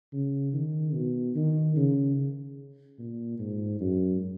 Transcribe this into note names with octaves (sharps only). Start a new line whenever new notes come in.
C#3
D#3
B2
D#3
C#3
A#2
G#2
F#2